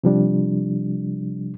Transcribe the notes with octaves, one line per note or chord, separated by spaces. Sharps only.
C3 F3 G3 D4